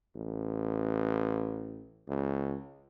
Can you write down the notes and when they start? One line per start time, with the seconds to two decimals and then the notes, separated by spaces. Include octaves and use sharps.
0.16 A1
2.08 C#2